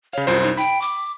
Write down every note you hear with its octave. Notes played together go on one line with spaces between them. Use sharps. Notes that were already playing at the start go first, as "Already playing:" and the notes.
C#3 C#5 F5
C2 F#2 F4 C5
D#4
G5 B5
D6